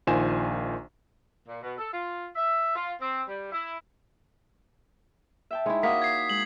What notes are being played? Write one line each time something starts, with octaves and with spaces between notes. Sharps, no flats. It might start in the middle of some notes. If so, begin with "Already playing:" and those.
A#1 D#3 F4 C5 G#5 E7
A#2
B2
A4
F4
E5
F4
C4
G3
E4
E5 G5 A5
G#3 D#4 E4 C#5 A#5
A#3 F#4 D#6 B6
G#6 C7
G#3 F#7